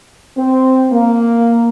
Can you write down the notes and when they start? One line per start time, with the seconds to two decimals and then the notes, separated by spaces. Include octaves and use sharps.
0.37 C4
0.93 A#3